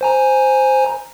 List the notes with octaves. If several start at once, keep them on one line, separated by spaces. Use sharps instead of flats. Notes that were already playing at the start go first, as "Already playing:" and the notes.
C5 G#5 A#5